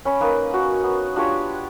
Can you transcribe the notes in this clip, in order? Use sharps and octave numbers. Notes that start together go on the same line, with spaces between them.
C#4 B5
A#3 D#4 B4
F#4
B3
D4 F4 G4 C#5